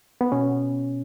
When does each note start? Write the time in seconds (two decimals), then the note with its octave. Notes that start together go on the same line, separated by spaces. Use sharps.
0.21 B3
0.32 B2 C#4